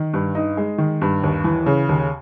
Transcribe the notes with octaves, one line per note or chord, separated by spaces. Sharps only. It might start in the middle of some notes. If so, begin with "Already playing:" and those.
Already playing: D#3
G2
D#4
G#3
D#3
G2
D#2
E3
C#3
D#2